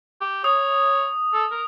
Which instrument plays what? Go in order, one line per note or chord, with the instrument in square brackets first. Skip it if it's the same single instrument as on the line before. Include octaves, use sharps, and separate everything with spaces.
[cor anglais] G4
[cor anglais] C#5 [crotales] D#6
[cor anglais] A4
A#4